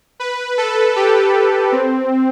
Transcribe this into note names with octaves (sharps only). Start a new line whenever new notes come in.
B4
A4
G4
C4